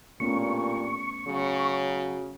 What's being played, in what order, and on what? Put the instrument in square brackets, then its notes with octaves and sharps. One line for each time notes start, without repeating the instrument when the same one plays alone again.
[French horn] G2 [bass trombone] A#2 [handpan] A3 B3 C#4 [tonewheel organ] C#6
[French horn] C#3 [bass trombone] F#3